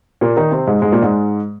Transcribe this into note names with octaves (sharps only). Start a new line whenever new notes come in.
A#2 A#3
D#3 D#4
C3 C4
G#2 G#3
G#2 G#3
A#2 A#3
G#2 G#3